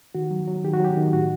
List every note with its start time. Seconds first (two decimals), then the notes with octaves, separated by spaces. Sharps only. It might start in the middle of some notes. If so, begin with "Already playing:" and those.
0.15 D#3 F#4
0.31 F#3
0.47 F#3
0.64 D#3 G4
0.74 F#4
0.80 F#3 G4
0.97 D#3
1.13 A2 F#4